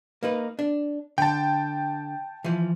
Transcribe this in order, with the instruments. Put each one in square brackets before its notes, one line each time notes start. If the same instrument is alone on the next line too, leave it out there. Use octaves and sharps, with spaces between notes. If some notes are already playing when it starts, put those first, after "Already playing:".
[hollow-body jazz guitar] A#3 D#4 B4
D4
[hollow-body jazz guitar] D3 [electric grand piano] G5 A5
[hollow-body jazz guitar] E3 F3